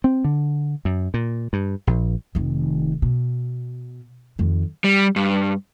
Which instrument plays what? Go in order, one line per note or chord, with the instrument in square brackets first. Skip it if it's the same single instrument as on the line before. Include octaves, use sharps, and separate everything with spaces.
[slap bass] C4
D3
F#2
A#2
G2
A#1
[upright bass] F1 D#3
B2
F2 D#3
[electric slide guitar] G3
G2